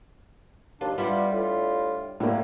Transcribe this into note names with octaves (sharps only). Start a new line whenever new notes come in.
D#2 D4 F4
G3 B3 D4 E4 F4
A2 F4
F#2 A2 D3 A#3